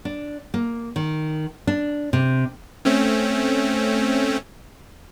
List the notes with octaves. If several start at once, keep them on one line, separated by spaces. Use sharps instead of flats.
D4
A#3
D#3
D4
C3
A3 C4 C#4